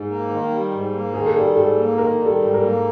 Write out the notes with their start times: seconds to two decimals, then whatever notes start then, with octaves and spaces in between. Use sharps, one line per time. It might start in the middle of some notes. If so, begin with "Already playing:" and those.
Already playing: G#2
0.09 A#3
0.29 D#3
0.50 G3
0.71 G#2
0.93 A#3
1.14 D#3 G#4
1.26 A4
1.34 G3 G#4
1.55 G#2 A4
1.77 A#3
1.98 D#3 A#4
2.19 G3
2.26 A4
2.40 G#2
2.54 A#4
2.61 A#3